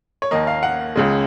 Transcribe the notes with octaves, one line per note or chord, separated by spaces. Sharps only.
C#5
D#2 D#3 A#3 D#5
F5
F#5
C#2 C#3 G#3